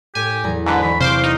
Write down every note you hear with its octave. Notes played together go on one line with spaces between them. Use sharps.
A2 G4 G#5
E2 F#3 A#5
G#2 D3 B4
E3 E4 B5 C#6
C3 C5 F5 C6 D6
D#4